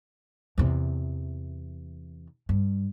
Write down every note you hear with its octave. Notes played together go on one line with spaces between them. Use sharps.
E2 C3
G2